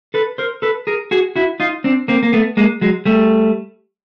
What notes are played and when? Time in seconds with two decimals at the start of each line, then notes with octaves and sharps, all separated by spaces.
0.14 A4 B4
0.38 A#4 C5
0.62 A4 B4
0.87 G#4 A#4
1.11 F#4 G#4
1.36 E4 F#4
1.60 D#4 F4
1.84 C4 D4
2.08 A#3 C4
2.23 A#3
2.33 A3 B3
2.57 G#3 A#3
2.81 F#3 G#3
3.05 G3 A3